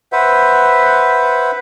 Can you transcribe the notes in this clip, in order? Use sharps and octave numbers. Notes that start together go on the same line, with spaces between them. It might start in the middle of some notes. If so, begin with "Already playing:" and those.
B4 C5 E5 F#5